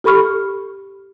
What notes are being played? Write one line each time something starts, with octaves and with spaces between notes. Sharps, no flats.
G4 A4 B5 C#6 F6